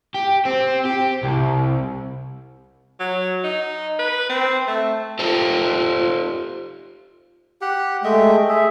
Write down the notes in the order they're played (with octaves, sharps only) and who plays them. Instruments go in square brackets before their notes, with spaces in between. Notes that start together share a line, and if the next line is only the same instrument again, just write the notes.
[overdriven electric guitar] G4
C4
G4
C2
[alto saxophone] F#3
D#4
B4
C4
A3
[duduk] F4 [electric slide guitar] G4 A4 C5
[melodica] G4 F#5
[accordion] G#3 A3 [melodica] D#5 E5 G5
[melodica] G#4 [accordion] E5